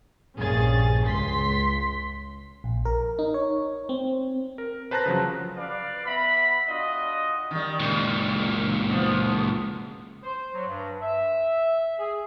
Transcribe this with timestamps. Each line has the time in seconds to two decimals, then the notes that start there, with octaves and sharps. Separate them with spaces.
0.36 A#1 G2 C#4 G#4 A6
1.05 C#2 C6 B6
2.64 A#1
2.85 A#4
3.19 D#4
3.34 C#5
3.89 C4
4.58 A#4
4.91 B4 C5 A5 A#5 F#6 A#6
5.06 C#3 F3 F#3
5.57 B4 D5 F5
6.06 B3 E5 A#5 B5
6.68 D4 F4 F#4 D#5
7.51 D#3 G3
7.80 C#2 A#2
8.91 F3 B3
10.23 C5
10.54 F#3
10.67 G2
11.02 E5
11.99 G#4